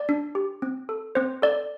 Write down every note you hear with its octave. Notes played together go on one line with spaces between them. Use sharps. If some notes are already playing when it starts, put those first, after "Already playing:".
Already playing: D5
D4
G4
C4
A4
C4 C5
A4 D5